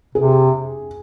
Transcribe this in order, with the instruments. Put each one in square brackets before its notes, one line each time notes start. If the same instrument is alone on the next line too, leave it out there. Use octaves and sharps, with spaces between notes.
[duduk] C3 [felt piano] G#4